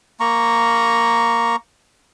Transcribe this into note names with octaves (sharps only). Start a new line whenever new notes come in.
A#3 A#5 C#6